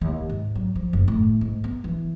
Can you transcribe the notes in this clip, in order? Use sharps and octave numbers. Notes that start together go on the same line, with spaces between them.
D#2
G#2
F#3
F3
F#1
A2
G#2
B3
E3